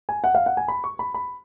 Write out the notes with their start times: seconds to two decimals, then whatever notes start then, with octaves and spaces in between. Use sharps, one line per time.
0.09 G#5
0.24 F#5
0.35 F5
0.46 F#5
0.57 G#5
0.68 B5
0.84 C#6
0.99 B5
1.14 B5